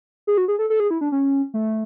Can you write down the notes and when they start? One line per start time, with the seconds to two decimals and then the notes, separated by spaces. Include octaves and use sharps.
0.27 G#4
0.38 F#4
0.48 G#4
0.59 A4
0.70 A4
0.80 G#4
0.91 E4
1.01 D4
1.12 C#4
1.54 A3